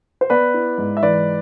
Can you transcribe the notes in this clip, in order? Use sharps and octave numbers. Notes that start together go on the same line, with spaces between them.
C5
B3 B4 D5
E4
G#2
E5
E3 B4 D5